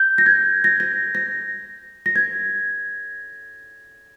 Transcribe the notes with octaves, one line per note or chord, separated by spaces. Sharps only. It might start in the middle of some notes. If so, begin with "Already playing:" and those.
Already playing: G6
A#6
G#6
A#6
A#6
A#6
A#6
G#6